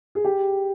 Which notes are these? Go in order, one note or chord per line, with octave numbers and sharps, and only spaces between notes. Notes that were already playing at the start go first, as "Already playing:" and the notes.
G#4
G4